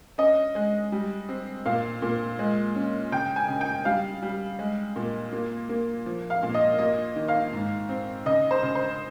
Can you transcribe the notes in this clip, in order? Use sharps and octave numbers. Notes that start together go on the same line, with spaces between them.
C#4 D#5
G#3
G3
C4
A#2 F5
A#2
G#3
C#4
C#3 G5
G#5
C#3
G5
G3 F5
G3
G#3
A#2
A#3
A#3
F3
F5
A#2
D#5
A#3 D#5
D#3
F5
G#2
C4
C#3 D#5
C5
C#3
C5